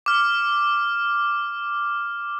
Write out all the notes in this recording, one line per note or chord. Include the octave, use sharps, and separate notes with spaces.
D6 F6